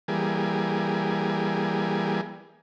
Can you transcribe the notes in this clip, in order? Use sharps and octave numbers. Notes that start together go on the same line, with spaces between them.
E3 G3 A#3 G#4